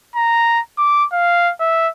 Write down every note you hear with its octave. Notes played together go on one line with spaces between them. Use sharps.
A#5
D6
F5
E5